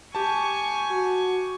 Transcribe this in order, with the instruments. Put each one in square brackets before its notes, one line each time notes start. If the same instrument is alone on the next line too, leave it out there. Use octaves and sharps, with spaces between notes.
[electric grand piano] G4 A5 [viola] G#5 C#6
[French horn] F#4